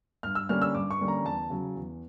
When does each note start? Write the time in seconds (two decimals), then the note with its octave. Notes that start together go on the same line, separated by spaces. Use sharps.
0.23 G2 F6
0.35 E6
0.49 D3 G3 A#3 C#4 F6
0.62 E6
0.75 G2 D6
0.91 C#6
0.99 D3 G3 A#3 C#4
1.08 A#5
1.24 E2 A5
1.50 C#3 F#3
1.75 E2